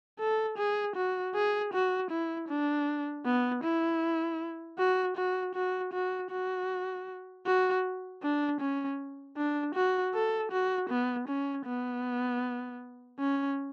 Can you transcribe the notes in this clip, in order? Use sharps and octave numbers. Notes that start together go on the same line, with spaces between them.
A4
G#4
F#4
G#4
F#4
E4
D4
B3
E4
F#4
F#4
F#4
F#4
F#4
F#4
D4
C#4
D4
F#4
A4
F#4
B3
C#4
B3
C#4